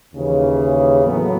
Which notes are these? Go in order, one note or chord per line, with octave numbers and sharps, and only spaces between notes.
D#2 C#3 E3
A2 F#3 B3